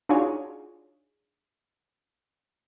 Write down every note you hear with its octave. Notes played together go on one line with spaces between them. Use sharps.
D4 D#4 F4 F#4 G#4 C#5